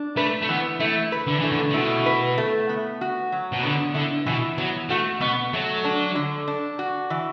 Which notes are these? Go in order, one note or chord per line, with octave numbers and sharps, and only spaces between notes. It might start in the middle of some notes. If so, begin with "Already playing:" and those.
Already playing: D4
A3 B4
A3
E3 B3
A3 E4
B4
D3
E3 A3
D3
D3
B2 E4
B4
A3
B3
F#4
F#3
B2
D3 B3
D3 E4
B2 E3
F#3 B3
A3 F#4
B2 B3
F#3 A3
D4
D3
D4
F#4
E3